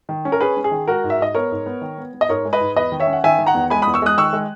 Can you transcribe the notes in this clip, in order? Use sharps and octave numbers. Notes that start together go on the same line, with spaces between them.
D#3
C#4
A#4
C#4 G#4 B4
C#4
G#4
D#3
G#3 F#4 A#4
G#2
E5
G#2 D#5
B3 A#4 C#5
G#2
B3
D#3
B3
B3
D#5
G#2 A#4 C#5
G#3
B4 D#5
G#2
E2 B4 D#5
D#3
C#5 E5
C#4
F#5
D#3 E5 G#5
D#3
F#5 A#5
E2
G#3 G#5 B5
B5 D#6
E2
C#6 E6
G#3 D#6 F#6
D#3 C#6 E6
G#3